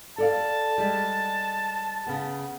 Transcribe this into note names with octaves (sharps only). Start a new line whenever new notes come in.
A4 D5 F5 A5
G3 G#3
C#3 B3